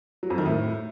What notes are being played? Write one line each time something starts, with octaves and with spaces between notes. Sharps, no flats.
F#3
F2
D#3
A2